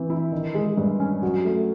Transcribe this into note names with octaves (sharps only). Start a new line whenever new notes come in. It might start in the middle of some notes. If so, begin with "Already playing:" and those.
Already playing: E3 C4
E4
D#3
G#3
G2
C#4
F#3
A3